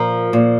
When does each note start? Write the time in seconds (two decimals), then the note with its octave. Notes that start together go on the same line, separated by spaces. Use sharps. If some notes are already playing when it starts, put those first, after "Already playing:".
Already playing: A#2 F3 A#4
0.33 A#2